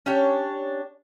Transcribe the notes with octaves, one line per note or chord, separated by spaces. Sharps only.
C#4 D4 G4 C#5